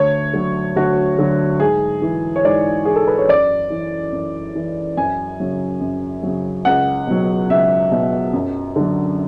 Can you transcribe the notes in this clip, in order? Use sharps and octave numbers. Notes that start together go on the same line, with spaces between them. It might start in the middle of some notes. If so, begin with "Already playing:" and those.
Already playing: D2 C#5
D3 F#3
D2 F#4
D3 F#3
G#2 G#4
E3
C#5
G#2 D5
E3 G#4
A4
B4
C#5
F#2 D5
E3
F#2
E3
F#2 G#5
C#3 F#3
F#2
C#3 F#3
C#2 F#5
B2 F#3
C#2 E5
B2 F#3
F#2
D3 F#3